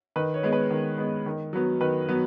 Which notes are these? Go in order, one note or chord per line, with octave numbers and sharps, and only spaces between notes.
D#3 B4
C#5
G#3 B3
B4
D#3
G#3 B3
D#3
F#3 B3
D#3 B4
F#3 B3